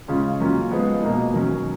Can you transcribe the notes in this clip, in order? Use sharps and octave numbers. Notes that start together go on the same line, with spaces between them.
C#3 G#3 C#4 F4
F#3 A#3 C#4 F4
F3 G#3 B3
B2 A#3 D#4
D#3 F#3 C#4